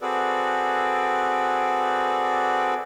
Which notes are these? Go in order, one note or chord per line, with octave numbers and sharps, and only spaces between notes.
C4 F#4 G#4 A4 B4 D5